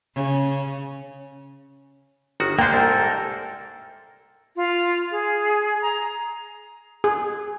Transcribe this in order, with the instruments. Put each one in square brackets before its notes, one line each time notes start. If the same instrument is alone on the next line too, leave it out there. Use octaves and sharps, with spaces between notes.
[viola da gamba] C#3
[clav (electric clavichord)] G1 D#3 F#4
[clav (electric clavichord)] G#2 D4 [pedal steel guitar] A#3 C5 [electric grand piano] G5
[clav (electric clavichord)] C2 G#2 [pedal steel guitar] A4 A#4
[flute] F4
G#4
A#5
[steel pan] G#4